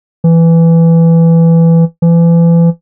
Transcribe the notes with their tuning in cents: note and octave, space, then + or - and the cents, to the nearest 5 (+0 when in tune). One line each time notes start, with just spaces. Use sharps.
E3 +10
E3 +35